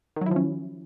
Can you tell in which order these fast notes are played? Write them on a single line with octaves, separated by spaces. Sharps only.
D#3 F#3 E4 F3 C#4